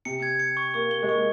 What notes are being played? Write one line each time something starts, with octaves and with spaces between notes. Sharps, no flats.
C3 C#7
G#6
C#7
C#6
A#3 C#6
G7
G#3
A#3 C#6